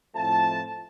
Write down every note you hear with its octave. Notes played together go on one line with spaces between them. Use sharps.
F2 A2 F3 A3 A5